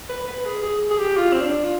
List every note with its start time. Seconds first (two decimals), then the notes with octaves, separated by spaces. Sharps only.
0.09 B4
0.27 B4
0.45 G#4
0.63 G#4
0.91 G#4
0.98 G4
1.17 F4
1.33 C4
1.41 D4
1.64 F4